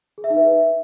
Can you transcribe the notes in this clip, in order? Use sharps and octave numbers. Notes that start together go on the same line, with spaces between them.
G#4
E5
D#4
B4
E5